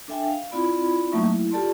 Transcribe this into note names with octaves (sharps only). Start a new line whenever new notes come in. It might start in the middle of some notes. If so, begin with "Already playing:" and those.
D4 A4 E5 G5 G#5
F5
C4 E4 F4 D5 B5
F#3 A3 A#3 D#4 E5 C#6
E4
F4 G4 A4 D5 A5 C6